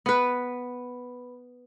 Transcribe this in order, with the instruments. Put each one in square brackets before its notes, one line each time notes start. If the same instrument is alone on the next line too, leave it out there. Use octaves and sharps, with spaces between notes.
[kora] B3 B4